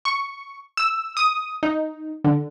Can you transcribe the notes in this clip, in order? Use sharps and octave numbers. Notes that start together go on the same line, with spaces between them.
C#6
E6
D#6
D#4
D3